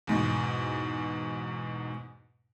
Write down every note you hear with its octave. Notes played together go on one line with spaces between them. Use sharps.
E2 G#2 B2